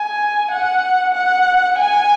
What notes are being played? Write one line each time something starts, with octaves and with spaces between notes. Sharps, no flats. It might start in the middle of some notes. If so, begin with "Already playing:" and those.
Already playing: G#5
F#5
F#5
G#5